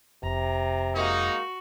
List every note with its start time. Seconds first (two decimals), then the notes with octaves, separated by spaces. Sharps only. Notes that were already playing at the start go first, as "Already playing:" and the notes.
0.23 F1 C3 A#5
0.96 G#3 A#3 D#4 F#4